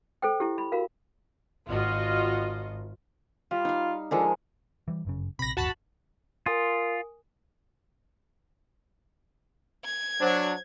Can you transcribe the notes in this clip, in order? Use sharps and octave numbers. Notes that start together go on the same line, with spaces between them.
A4 C5 G5
E4 G4
B5
F#4 A#4 F5
G#1 F4 F#4 D#5
G3 F4
D#4 F5
D3 F3 G#3 A#4
E3 G3
G1 F#2 C#3
A#1 C3 B5 A#6
D1 G1 D#2 F#4 A5 B5
F4 A#4 G#5 D#6
G#6
F#3 D4 C5